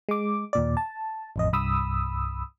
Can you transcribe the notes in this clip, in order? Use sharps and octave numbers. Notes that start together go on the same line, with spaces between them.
G#3 D6
D#2 A#2 D5
A5
A1 F2 D#5
C2 G2 B5 D#6 E6